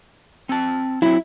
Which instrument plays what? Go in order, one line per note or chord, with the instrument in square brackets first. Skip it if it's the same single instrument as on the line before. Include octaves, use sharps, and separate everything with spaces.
[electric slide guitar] C4 A5
[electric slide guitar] F#3 C4 [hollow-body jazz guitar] E4